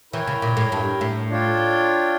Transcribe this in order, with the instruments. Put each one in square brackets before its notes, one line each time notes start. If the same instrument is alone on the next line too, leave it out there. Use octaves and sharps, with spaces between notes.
[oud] E3 [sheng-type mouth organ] E4 A#4 C#5 G5
[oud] C#3
A#2
A2
G2
A2
[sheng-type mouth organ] D4 F4 C#5 G5